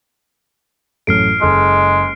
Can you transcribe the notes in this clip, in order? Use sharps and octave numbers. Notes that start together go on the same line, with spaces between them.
A1 F#2 A3 F6 C7 D7
F#1 G#3 A4 D#5